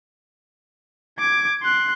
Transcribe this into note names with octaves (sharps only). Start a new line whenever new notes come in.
D6 G#6
C6 F#6